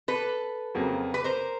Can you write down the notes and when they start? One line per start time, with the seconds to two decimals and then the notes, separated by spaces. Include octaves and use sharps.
0.08 A4 B4
0.75 F2 C#3 F#3 A#3
1.14 B4
1.24 A#4 C5